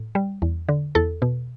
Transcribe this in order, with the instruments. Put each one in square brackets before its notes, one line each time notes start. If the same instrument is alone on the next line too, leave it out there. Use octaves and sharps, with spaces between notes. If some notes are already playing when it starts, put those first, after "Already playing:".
Already playing: [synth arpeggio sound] A2
G3
E2
D3
E2 A4
B2